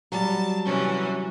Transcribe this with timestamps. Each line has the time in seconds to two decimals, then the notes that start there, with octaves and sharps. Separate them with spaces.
0.12 F#3 G3 A5
0.65 C3 E3 C#4